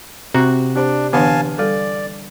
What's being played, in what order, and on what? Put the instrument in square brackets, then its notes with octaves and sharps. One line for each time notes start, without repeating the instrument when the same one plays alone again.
[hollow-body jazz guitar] C3 [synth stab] F#4 [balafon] A#5
[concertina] D4 [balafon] G4 C5 D5
[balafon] D3 E3 D4 [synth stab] B3 [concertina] F5 G#5 A5
[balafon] G3 A4 [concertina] D5